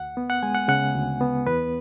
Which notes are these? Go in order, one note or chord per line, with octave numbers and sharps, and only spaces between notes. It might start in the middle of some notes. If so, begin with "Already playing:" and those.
Already playing: D2 F#5
B3
F#5
G#3 G#5
F#5
C#3 F#5
D2
B3
E2 B4